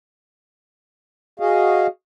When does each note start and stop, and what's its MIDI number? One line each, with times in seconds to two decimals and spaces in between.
1.40 1.87 66
1.40 1.87 68
1.40 1.87 75
1.40 1.87 77